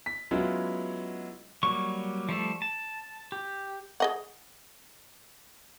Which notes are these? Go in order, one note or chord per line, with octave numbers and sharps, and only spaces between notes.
B6
F#3 G#3 B3 C#4 E4 F4
F#3 G3 A#3 C#6
F3 G3 A3 A4
A5
G4
G#4 D#5 F#5